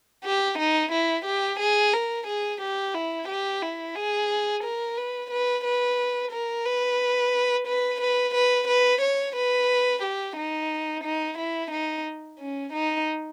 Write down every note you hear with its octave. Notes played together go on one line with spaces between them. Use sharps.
G4
D#4
E4
G4
G#4
A#4
G#4
G4
E4
G4
E4
G#4
A#4
B4
B4
B4
A#4
B4
B4
B4
B4
B4
C#5
B4
G4
D#4
D#4
E4
D#4
C#4
D#4